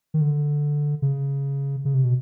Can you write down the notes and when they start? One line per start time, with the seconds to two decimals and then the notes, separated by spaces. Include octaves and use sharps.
0.14 D#3
0.21 D3
1.02 C#3
1.85 C#3
1.94 C3
2.04 B2